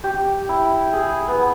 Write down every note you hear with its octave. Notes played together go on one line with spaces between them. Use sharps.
G4
E4
G#4
B3